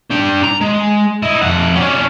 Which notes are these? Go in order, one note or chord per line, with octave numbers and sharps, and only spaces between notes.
D4 G5
A#5
G#3
D#4 E4
F2 F#5
C#4 D4